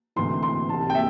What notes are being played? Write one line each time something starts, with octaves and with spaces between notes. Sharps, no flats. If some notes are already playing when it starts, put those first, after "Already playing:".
D2 C3 E3 C6
C6
C2 C3 E3 A5
G5
E5